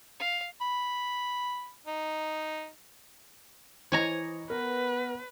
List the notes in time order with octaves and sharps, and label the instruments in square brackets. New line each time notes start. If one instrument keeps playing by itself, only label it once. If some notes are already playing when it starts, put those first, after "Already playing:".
[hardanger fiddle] F5
[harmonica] B5
D#4
[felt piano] E3 D#5 [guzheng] C#5 G#5 A#5
[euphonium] B3 [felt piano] A#4 [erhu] B4